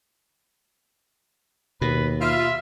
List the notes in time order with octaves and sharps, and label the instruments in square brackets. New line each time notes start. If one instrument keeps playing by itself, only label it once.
[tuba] D#2 [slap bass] B2 [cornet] B4
[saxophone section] F4 [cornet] E5